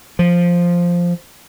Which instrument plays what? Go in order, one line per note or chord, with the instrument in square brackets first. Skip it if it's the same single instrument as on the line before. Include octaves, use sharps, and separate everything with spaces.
[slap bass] F3